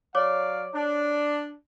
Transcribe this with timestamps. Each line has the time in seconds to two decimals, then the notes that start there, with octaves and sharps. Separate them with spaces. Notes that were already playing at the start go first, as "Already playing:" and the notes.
0.15 F#3 C#5 D5 F5 D6
0.74 D4